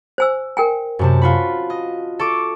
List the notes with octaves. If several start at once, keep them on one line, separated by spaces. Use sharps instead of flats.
C5 G#5 E6
A#4 G5 G#5
F#2 C3 A5
F4 F#4 B5
D#5
A4 C#6 D6